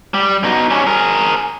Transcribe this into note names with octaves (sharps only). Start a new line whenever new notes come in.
G3
B2 D#4
G3 C#4
G#4 A#4